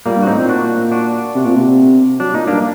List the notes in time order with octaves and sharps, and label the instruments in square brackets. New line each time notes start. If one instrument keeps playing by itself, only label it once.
[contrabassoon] A#2 [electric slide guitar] G3 A#3
[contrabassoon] G2
[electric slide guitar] F#4
[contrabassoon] A2 [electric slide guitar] C4 D#4
[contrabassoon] A#2
[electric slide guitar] D4 F#4
D4 F#4
[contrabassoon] C3
A#2
C3
[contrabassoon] F#3 [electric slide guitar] D4
[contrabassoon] A#2 [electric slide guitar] D#4
[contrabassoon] G2 [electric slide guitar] A#3 D4